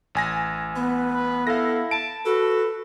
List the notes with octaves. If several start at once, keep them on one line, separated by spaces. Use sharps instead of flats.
A1 G#5 A#6
B3 B4
B4
E4 A4 F5 A#6
A5 D7
F#4 A4 B4